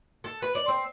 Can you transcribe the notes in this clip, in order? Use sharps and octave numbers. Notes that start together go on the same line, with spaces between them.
A4
B4
D5
C4